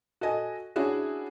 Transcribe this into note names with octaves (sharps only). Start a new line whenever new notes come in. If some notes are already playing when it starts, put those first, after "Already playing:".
F#4 A4 D#5 G#5
C#4 D4 E4 F#4 G#4